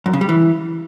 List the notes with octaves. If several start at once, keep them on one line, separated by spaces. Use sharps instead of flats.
F#2
C#3
G3
E3